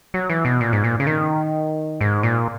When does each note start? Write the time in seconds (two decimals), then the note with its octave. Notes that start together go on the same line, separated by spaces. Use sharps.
0.14 F#3
0.30 E3
0.45 B2
0.61 A#2
0.73 G#2
0.84 A#2
1.00 C#3
1.07 D#3
2.01 G#2
2.23 A#2